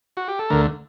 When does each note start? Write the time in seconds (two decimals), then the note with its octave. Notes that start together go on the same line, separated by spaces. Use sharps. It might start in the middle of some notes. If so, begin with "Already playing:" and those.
0.17 F#4
0.28 G4
0.39 A4
0.50 D2 D3 A3 A#4